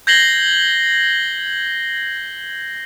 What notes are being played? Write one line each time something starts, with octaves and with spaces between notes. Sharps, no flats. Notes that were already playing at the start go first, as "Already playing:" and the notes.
G6 G#6 A#6 C7 F#7 G7